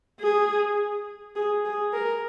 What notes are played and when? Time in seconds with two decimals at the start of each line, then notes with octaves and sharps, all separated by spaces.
0.20 G#4
1.36 G#4
1.65 G#4
1.93 A#4